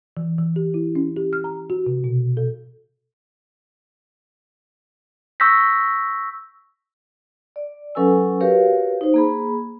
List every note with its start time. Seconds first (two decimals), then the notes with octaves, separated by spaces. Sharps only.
0.17 E3
0.39 E3
0.56 G4
0.74 E4
0.95 C#4
1.16 G4
1.33 F6
1.44 A#5
1.70 F#4
1.87 C3
2.04 B2
2.37 A4
5.40 C#6 E6 G6 A#6 B6
7.56 D5
7.95 F#3 C#4 A4 B4 G#5 E6
8.40 F#4 G4 A#4 B4 C#5 F5
9.01 D#4 C5
9.14 A#3 G#4 B5